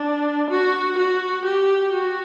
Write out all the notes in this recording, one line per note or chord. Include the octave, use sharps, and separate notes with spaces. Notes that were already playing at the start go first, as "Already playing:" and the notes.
Already playing: D4
F#4
F#4
G4
F#4